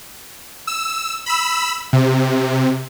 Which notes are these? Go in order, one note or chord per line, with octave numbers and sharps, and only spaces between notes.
E6
B5 E6
C3